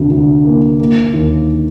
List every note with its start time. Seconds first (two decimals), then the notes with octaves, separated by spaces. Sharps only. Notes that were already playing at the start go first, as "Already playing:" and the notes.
Already playing: D2 C3
0.10 D2
0.45 A#3
0.79 A#3
1.13 D#2